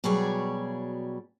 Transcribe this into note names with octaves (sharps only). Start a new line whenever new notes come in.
B2 F#3 G3 G#4 C#5 D5